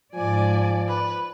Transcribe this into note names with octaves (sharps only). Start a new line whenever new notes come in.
G#2 F3 D5 G#5
B4